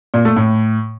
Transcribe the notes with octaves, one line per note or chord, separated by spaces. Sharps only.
A#2
A3
A2